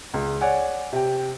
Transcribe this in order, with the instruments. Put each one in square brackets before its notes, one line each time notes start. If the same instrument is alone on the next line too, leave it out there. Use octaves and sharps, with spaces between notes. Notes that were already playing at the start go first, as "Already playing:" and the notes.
[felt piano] C#2
C#5 D5 F#5 G#5
C3 G5